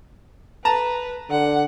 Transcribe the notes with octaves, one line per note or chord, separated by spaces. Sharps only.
B4 A5 A#5
D3 F#5